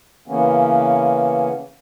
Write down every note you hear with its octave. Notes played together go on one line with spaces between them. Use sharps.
C#3 E3 A#3 B3 C#4